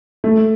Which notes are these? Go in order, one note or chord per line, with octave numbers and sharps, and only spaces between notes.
A3